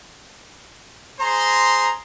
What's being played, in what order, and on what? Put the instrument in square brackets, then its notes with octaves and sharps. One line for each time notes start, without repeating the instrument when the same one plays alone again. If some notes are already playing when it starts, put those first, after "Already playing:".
[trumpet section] G#4 C5 C6 [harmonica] A#5